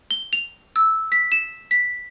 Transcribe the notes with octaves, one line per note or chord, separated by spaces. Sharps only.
G7
F7
E6
B6
E7
B6